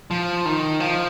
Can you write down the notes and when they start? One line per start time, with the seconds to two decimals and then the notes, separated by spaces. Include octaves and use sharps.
0.11 F3
0.45 D#3
0.80 F3